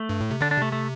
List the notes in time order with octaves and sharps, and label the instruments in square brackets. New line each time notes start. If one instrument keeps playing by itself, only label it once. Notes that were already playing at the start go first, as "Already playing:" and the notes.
Already playing: [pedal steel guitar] A3
[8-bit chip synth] G2
A2
C3
[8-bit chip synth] D3 [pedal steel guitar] D4
[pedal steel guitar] D4
[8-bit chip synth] C3 [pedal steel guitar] A3
[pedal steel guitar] A3